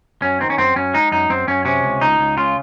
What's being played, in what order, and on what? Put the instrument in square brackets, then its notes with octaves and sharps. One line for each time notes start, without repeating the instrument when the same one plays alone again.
[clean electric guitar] F#2 C#4
D#3 C4
C#4
F#2 C4
F#2 C#4
G#3 D#4
F#2 D#4
F#2 C4
F#2 C#4
C3 C#4
C#2
C#2 D#4
C#2
C#3 F4